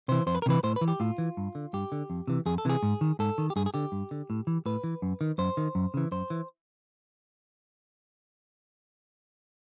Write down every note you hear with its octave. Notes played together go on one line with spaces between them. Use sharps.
C3 E3 C5
F2 C5
B4
A#4
C3 E3 B4
A2 C5
B4
E3
G4
A2 F4
E3
G2
D3
G2 G4
D3
F2
C3 E3
F2 G#4
A4
C3 E3 G#4
G#2
D#3
G#2 A4
D#3
G4
G2 G#4
G#4
D3 G4
G2
D3
A2
E3
A2 B4
E3
F#2
D#3
F#2 C5
D#3
F#2
C#3 E3
F#2 C5
E3